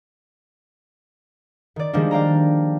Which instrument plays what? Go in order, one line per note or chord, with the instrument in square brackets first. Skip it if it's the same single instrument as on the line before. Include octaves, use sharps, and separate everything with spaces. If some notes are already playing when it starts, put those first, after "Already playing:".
[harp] D#3 D5
D#3 F3 G3 G#3 A#3 D4
D5 F5 G5 A#5